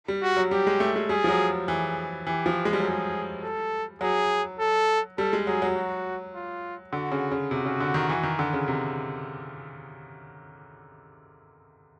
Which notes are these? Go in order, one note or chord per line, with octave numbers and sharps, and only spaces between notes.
G3
F#4
F#3
G3 G4
G#3
A3
G#3
G3 G#4
F3
F#3
E3 G#4
E3 G4
F3
G#3
G3
F#3
G3 G#4
A4
F#3 G#4
A4
G3 A4
G#3
F#3 G#4
F#3
F#4
F4
D3 F#4
C#3
C#3
C3 F#4
C#3
D3
D#3
E3
D#3
D3
C#3
C3